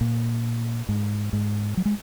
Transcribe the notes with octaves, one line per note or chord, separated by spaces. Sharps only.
A#2
G#2
G#2
F#3
G#3